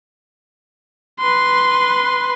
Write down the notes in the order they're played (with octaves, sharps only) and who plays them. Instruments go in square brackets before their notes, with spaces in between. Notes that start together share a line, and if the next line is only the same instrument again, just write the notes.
[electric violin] B4 C6